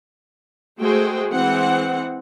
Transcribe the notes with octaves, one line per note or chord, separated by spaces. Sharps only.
G#3 A3 F#4 G#4 C5 G5
E3 G#3 C4 F#5